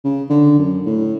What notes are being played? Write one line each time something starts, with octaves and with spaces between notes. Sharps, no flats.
C#3
D3
F#2
A2